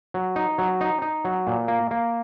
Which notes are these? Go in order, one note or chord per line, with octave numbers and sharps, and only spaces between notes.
F#3
D#4
F#3
D#4
D#4
F#3
A#2
A#3
A#3